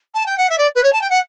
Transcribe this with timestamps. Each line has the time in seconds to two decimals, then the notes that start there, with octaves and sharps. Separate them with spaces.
0.15 A5
0.26 G5
0.38 F#5
0.50 E5
0.58 D5
0.75 B4
0.84 C#5
0.93 A5
1.01 G5
1.10 F#5